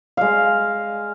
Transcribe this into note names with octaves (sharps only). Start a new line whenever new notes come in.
G#3 F5